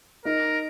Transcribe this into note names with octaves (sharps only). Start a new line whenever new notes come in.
D#4 A#4